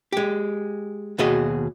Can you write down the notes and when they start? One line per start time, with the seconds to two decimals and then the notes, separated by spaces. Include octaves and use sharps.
0.12 G#3 G4
1.18 D#2 B2 F#4 G#4 D#5